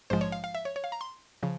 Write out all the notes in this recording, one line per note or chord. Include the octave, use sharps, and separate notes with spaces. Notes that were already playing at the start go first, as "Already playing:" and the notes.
A#1 G#2 F3 G#3 C5
C#5
F5
F5
E5
C#5
C#5
F5
A#5
C6
C#3 F3